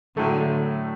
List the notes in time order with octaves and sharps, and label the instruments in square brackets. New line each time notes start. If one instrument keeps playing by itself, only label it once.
[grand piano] A2 F#3 A3 [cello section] D3